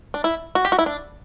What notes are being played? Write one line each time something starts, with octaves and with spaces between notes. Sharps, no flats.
D4
E4
F#4
G4
F#4
E4
D4